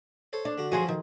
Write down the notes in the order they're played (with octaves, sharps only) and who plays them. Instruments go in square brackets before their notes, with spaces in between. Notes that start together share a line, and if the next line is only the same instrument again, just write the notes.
[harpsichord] A4 C5 C#5
[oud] D4
[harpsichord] D3 F#4
[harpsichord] G2 F3 F#3 [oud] F#4 G#4 C5
[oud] D#3